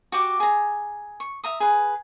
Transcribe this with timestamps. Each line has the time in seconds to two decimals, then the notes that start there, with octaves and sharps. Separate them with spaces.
0.12 F#4 G4 D6
0.40 G#4 A#5
1.20 C#6
1.44 E5 A#5 D#6
1.60 G#4 B4